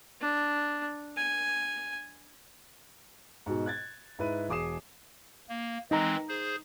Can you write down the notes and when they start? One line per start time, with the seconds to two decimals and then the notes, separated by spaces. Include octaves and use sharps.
0.21 D4
1.17 G#5
3.46 G#2 B2
3.66 F#6 G#6 A6
4.19 G#2 E4 B4 D#7
4.49 E1 G#4 D6 D#6 C7 E7
5.49 A#3
5.91 E3 G#3 C4 D#4 A#5
6.29 G#4 C5